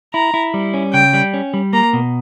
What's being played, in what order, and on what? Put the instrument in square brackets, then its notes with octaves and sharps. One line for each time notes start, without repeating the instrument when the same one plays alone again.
[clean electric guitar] E4 [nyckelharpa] A#5
[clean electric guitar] E4
G3
C#4
[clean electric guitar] C#3 [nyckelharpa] G5
[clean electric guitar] G3
C#4
G3
[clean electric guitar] A#3 [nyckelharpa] A#5
[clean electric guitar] B2